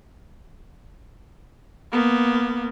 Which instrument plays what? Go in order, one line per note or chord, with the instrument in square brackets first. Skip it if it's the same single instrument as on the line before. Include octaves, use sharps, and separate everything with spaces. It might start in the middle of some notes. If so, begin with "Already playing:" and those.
[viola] A#3 B3